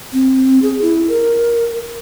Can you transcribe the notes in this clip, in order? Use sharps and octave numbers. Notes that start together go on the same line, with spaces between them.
C4
G#4
E4
A#4